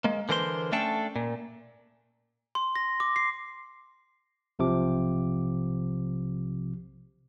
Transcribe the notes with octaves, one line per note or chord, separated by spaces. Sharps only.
G#3 A#3
D3 E3 A#4 C5 C6
A3 C#4 D4 A4 G5 A5
A#2
C6
A#6
D6
C7
B1 C3 F3 D6